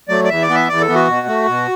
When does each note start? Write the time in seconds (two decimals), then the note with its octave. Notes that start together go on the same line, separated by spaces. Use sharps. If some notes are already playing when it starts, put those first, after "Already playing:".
0.08 F#3 A3 D5
0.24 D5
0.28 E2 E5
0.42 D5
0.48 E3 B3
0.55 E5
0.68 E2 D5
0.81 A4
0.88 E3 B3
0.95 F#4
1.08 B2
1.27 A3
1.47 B2